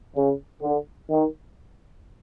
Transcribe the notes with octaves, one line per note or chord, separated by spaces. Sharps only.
C#3
D3
D#3